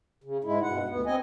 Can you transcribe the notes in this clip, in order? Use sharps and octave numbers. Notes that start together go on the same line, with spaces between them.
C#3
G#2 G#3 E4
G2 B2 F#5
D2 B3
C4 D#5 G#5